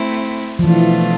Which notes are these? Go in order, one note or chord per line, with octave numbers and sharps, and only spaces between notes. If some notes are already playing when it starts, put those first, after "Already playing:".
Already playing: A3 C4 E4
F3
B2 E3 A3 D4 F4